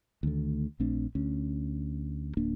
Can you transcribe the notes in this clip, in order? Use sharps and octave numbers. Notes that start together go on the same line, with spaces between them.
D2 D#3 A3
A#1 A3 C4 D4
D2 C#4
D1 A#3 D4